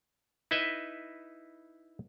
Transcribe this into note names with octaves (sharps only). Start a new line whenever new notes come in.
D#4 E4 B4 D#5 E5